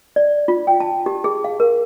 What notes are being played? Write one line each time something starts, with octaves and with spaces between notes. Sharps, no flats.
D5
F4
G5
A5
G4
G#4
F5
A#4